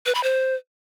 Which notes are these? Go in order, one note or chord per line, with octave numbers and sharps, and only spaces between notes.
B4
B5
C5